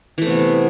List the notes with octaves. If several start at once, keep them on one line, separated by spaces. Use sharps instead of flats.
C3 E3 A3 B3